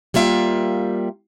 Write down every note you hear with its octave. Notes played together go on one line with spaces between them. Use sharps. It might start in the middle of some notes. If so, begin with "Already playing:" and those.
G3 A#3 F4 E5 F#5 G5